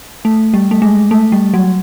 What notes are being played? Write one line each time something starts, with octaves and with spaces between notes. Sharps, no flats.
A3
G3
A3
G#3
A3
G3
F#3